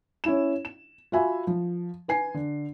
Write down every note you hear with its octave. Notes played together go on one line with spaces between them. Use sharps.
C#4 E4 E7
E7
F4 F#4 E5 G#5 B5
F3
B4 G#5 C7
D3